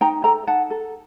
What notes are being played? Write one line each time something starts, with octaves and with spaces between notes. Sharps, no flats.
D#4 G5 A#5
A4 G5 A#5
D#4 F#5 A5
A4